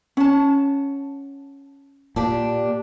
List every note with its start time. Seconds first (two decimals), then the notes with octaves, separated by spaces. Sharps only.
0.17 C#4 F#5 A5
2.16 A#2 D4 G4